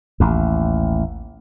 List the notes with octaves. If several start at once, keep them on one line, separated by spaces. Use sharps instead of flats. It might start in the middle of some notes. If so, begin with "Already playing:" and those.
A1 D#2